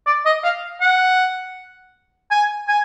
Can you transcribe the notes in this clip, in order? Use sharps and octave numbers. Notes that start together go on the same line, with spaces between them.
D5
D#5
F5
F#5
G#5
G#5